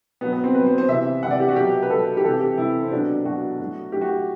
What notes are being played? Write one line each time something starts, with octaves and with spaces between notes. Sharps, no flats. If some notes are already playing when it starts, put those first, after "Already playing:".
B2 F#3 B3
B3
C4
B2 F#3 B4
C5
C5
C3 E3 E5
C3 E3 D5 F#5
G4
F#4
B2 F#3 G4
B4
B2 F#3 A4
G4
C3 E3 A4
G4
C3 E3 E4
C4
B2 F#3 D4
B2 F#3 F#4
A2 F#3
A2 F#3 G4
F#4
G4